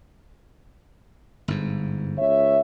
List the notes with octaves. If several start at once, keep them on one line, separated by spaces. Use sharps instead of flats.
G1 G#2
C#2 C#5 E5